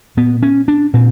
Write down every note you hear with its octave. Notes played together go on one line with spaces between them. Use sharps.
A#2 B3
C#4
D4
A#2 C4